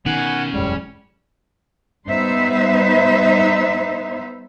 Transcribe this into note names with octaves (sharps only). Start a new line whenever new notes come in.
B2 D#3 C#4 F#5 G#5 B5
E1 F#2 A2 G3 G#3
G3 B3 D#4 B4 C5 E5